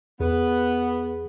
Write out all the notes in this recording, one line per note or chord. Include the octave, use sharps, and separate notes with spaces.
E2 B3 G#4